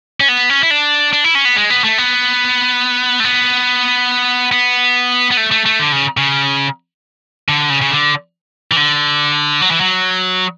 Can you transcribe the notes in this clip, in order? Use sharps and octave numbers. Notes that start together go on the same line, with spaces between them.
C#4
B3
C#4
E4
D4
D4
E4
C#4
B3
G#3
B3
A3
B3
A3
B3
B3
B3
A3
A3
A3
D3
C#3
C#3
D3
C#3
C#3
D3
E3
D3
F#3
E3
F#3